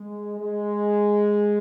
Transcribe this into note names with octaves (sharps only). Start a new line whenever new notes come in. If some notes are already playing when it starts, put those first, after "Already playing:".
Already playing: G#3
G#3